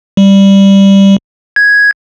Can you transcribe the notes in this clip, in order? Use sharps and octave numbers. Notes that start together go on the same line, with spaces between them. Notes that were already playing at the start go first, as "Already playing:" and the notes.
G3
G#6